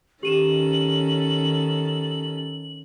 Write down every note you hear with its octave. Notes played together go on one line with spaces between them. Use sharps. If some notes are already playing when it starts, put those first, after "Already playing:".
D#3 C#4 G4 A4 D#7 E7 F#7